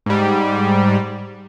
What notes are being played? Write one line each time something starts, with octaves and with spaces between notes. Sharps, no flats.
G#2 G3